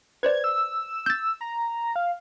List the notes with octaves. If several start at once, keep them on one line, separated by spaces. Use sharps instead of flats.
B4 C5 D5 G#6
E6
G6 A6
A#5
F5